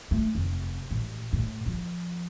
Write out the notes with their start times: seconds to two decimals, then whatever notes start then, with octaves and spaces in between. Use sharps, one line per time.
0.11 A3
0.35 F1
0.91 A1
1.33 A2
1.66 F3